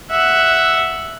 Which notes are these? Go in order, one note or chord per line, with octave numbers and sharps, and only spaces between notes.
E5 F#5